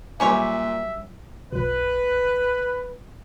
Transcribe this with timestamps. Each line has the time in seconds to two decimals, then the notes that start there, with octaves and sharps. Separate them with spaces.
0.20 A#2 F#3 G3 C#4 G4 C#5 E5
1.52 B1 F#2 B4